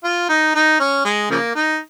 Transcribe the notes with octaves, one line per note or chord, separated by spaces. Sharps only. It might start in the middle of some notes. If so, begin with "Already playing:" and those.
F4
D#4
D#4
C#4
G#3
C#3 F3 A#3
D#4